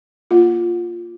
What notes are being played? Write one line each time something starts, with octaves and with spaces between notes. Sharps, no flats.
A#3 F4